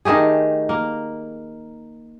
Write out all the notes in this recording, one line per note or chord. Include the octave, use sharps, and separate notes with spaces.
D#3 A3 G4 G#4
A#3